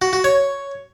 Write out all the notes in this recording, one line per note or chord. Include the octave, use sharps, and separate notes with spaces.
F#4
F#4
C#5